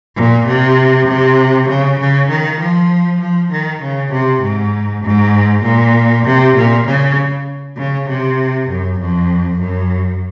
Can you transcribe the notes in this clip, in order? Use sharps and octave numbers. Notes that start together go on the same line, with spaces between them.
A#2
C3
C3
C#3
C#3
D#3
F3
F3
D#3
C#3
C3
G#2
G#2
A#2
C3
A#2
C#3
C#3
C3
F#2
F2
F#2